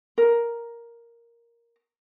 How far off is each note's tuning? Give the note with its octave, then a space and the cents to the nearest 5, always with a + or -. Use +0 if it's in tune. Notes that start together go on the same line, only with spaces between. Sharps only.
A#4 +5